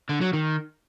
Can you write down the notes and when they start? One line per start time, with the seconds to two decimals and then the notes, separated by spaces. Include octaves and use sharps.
0.09 D3
0.21 F#3
0.33 D#3